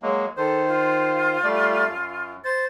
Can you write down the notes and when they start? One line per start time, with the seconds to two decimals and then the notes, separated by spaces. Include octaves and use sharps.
0.02 F#3 G#3 A#3
0.37 D#3 A4 C5
0.68 F4
1.44 G3 A3 D5
1.87 F#2
2.44 C5 A6